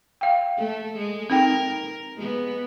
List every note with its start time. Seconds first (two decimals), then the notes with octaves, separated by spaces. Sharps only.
0.21 F5 G5
0.58 A3 A4
0.97 G#3
1.30 C4 D#4 A#4 G5
2.17 G#3 B3